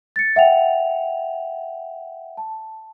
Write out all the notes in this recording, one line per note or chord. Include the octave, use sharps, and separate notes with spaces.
A6 C#7
E5 F#5 G5 F7
A5